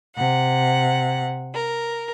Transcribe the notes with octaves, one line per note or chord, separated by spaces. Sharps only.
C3 F#5
A#4